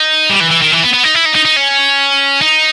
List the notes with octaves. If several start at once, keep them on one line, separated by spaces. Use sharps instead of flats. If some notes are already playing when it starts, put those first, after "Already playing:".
Already playing: D#4
G3
E3
E3
D#3
E3
B3
B3
D#4
E4
D#4
D#4
D#4
C#4
D#4